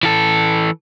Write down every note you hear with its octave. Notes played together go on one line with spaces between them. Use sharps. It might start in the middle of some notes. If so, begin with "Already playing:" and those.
E3 A4